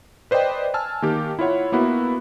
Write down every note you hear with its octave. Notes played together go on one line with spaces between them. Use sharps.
B4 C5 D5 D#5 G5
G#5 A5 E6 F6
D#3 A#3 G4 A5
E4 F4 C#5 F#5
A#3 B3 E4 F#4 B4